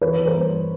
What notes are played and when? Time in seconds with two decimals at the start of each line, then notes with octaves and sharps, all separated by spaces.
0.02 E3 B4 C#5
0.18 E3
0.27 A#4 C5
0.35 G2